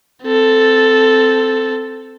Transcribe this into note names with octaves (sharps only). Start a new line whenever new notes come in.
C4 A4